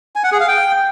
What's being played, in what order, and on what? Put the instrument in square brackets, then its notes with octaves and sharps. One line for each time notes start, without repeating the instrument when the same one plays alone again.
[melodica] G#5
F#5
G#4
F5
G5